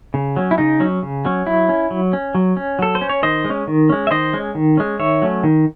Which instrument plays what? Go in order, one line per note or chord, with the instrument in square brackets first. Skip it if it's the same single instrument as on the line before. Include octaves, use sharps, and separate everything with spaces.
[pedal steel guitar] C#3
F#3 C#4
E4
C#3 D#4
F#3 C#4
C#3
F#3 C#4
F#3 E4
C#4
F#3
C#4
F#3
C#4
F#3 A4
C5
C#4
C#5
D#3 C5 D#5
G#3
C#4
D#3
G#3 C#4
E5
D#3 C5 D#5
G#3 C#4
D#3
G#3 C#4
D#3 C#5 E5
F#3 A3 C#4
D#3